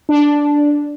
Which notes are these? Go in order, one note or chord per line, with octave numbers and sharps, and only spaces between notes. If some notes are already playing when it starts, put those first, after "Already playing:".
D4